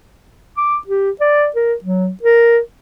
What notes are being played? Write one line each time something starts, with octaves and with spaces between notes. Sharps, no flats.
D6
G4
D5
A#4
F#3
A#4